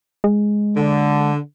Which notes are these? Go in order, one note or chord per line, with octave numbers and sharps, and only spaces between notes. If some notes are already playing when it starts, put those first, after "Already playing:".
G#3
D3